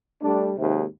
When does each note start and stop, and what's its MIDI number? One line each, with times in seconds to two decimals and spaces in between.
0.22 0.51 55
0.22 0.51 57
0.22 0.51 62
0.56 0.82 32
0.56 0.82 39
0.56 0.82 48